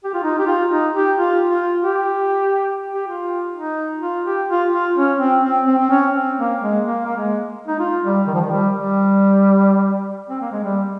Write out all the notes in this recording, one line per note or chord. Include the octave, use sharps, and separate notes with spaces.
G4
F4
D#4
G4
F4
D#4
G4
F4
F4
G4
G4
F4
D#4
F4
G4
F4
F4
C#4
C4
C4
C4
C4
C#4
C4
A#3
G#3
A#3
A#3
G#3
D#4
F4
G3
D#3
F3
D#3
G3
G3
C4
A#3
G#3
G3